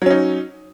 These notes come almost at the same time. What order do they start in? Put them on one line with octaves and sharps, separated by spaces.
F#3 C#4 D#4